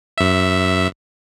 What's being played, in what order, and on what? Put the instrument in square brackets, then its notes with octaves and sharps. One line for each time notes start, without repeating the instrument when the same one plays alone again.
[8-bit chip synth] F#2 E5